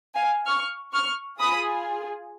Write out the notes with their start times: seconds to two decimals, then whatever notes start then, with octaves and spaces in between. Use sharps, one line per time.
0.15 F5 G#5
0.46 C#6 F6
0.92 C#6 F6
1.40 F4 G#4 B5 D#6